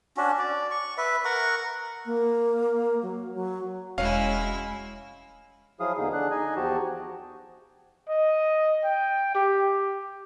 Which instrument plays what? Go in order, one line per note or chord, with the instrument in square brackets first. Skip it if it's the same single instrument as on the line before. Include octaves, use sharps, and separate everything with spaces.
[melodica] C#4 D4 F#4
D5
C#6
B4 E5
A#4 F#5 C#6
[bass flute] A#3
F#3
F#3
[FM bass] E1 [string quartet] G#3 E4 [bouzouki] C#4 F#4 [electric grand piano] F5
[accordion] F3 F#3 E4 G#4 F5 D#6
E2 D3 A#3 D#4 G#4
D3 D4 G#4 F#6
D#4 D#5 G#5
E2 F3 F#4 G4 A5
[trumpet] D#5
G5
G4